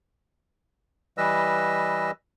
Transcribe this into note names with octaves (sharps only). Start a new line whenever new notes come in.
E3 G3 B4 D#5 E6